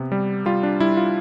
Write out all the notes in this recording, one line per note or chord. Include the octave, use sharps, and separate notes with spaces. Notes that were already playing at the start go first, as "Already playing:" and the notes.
Already playing: C3 B3
G3
G3 F4
D4
G3 E4
F4